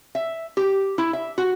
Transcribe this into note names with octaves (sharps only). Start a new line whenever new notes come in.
E5
G4
E4
E5
F#4